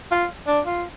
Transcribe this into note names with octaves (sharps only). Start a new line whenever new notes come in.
F4
D4
F4